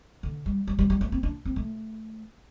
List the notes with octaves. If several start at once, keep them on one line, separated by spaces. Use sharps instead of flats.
D3
G3
G3
G3
G3
A3
C4
D4
C4
A3